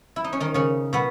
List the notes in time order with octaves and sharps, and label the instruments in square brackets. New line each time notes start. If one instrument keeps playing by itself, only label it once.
[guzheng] E4
D#4
C#4
D#3 D#4
C#3 C#4
B2 B3